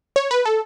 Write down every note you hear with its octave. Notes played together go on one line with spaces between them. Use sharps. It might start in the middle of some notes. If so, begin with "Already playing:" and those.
C#5
B4
A4